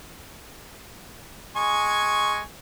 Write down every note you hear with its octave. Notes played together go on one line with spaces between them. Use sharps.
G#3 G#5 C#6